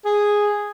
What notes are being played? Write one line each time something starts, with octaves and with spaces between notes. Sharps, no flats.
G#4